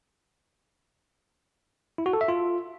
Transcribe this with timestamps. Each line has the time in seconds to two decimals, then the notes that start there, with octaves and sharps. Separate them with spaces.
1.98 E4
2.06 F#4
2.13 A4
2.21 E5
2.28 F4